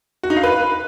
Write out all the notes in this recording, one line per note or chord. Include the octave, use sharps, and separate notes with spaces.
F#4
D#4
F5
B4